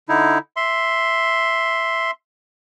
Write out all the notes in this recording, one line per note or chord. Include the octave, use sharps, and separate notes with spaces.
D3 D#4 E4
E5 C6